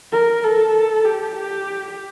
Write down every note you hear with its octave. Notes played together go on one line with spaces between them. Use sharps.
A#4
A4
G4
G4